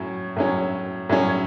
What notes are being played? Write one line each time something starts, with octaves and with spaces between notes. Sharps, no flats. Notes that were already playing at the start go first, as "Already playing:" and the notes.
Already playing: A2 F#3 C#4
A2 F#3 C#4
A2 F#3 C#4